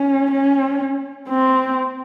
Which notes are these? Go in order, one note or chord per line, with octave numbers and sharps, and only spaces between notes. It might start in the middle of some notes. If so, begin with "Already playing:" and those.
Already playing: C#4
C#4
C4